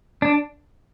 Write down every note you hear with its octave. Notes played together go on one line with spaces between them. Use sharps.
D4